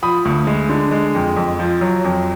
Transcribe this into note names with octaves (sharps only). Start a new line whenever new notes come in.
F3 B5 D#6
D2
G#3
D3
G#3
F2
F2
F3
F#3
F2